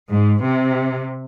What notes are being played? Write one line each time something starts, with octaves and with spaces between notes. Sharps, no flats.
G#2
C3